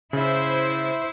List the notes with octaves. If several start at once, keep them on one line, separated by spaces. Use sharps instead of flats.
C#3 E4 C5